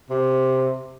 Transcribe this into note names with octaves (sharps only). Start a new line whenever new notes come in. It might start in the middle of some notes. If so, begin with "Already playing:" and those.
C3